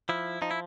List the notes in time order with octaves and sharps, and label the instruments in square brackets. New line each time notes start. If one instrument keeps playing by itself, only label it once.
[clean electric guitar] F3 E4
F3 D#4
E4